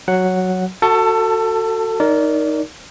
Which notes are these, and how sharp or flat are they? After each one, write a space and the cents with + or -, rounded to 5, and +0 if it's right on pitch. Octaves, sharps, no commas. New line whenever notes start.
F#3 +0 F#5 +0
F#4 +0 A4 +25 A5 +0
D#4 +0 A#4 +0 D5 -30